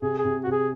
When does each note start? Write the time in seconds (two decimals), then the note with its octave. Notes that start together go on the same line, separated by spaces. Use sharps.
0.02 C3 G#4
0.19 G#4
0.24 C3
0.44 F#4
0.47 C3
0.52 G#4